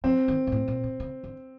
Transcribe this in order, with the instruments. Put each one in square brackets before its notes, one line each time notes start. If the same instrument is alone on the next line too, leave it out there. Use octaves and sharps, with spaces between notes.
[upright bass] F3 [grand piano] C4
[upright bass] D#3
A#2
A2
A#2
C3
C#3
D3